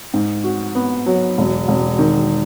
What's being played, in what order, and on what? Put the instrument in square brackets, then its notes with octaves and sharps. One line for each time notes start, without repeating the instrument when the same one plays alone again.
[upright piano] G#2
F#4
B3
F#3
E1
E1
D#3